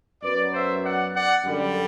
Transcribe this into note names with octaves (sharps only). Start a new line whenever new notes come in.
F#2 F#3 B3 B4 D5
C5 E5
D5 F#5
D5 F#5
F#2 D3 G3